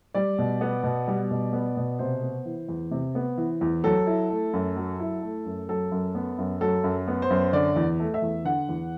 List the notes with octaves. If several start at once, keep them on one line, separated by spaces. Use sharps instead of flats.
G3 D5
B2
B3
B2
G3
B2
B3
B2
C3 C5
B3
E3
E2
C3
B3
E3
E2
F#3 A4
E4
A3
F#2
F#3
E4
A3
F#2
F#3 A4
F#2
B3
F#2
F#3 A4
F#2
B3
C5
F#2
D3 D5
E2
A3
E5
E2
D3 F#5
E2